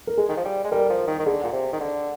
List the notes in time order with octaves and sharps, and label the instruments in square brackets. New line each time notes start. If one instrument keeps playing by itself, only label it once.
[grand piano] A#4
[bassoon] G#3 [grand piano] G#4
[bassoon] D#3
F3
G3
G#3
[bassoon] G3 [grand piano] A#4
[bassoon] F3
D#3
D#3
[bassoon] D3 [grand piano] G#4
[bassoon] A#2
C3
D#3
D3